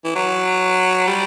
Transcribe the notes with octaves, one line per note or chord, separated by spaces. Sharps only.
E3
F#3
G3